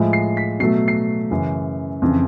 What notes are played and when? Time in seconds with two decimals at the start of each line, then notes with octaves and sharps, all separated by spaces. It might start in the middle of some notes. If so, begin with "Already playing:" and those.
Already playing: A2 F3 G#3
0.13 C7
0.37 B6
0.60 B2 F#3 A3 C7
0.88 C7
1.31 F#2 C#3 E3
2.02 F2 C#3 E3